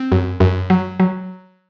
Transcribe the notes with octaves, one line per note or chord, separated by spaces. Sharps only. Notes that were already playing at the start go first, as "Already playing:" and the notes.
Already playing: C4
F#2
F#2
F#3
F#3